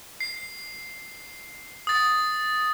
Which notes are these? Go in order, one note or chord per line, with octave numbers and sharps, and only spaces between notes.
C7
D#6 A6